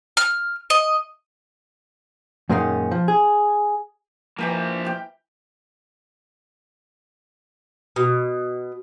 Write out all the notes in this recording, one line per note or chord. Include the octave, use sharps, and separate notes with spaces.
F6
D#5
F#2 A#2 D#3 G#3 A#3 C#4
F3
G#4
E3 F3 A#3 G4 A#4
G4 G5
B2